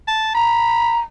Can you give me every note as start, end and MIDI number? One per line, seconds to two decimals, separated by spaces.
0.07 0.31 81
0.34 0.99 82
0.34 1.00 83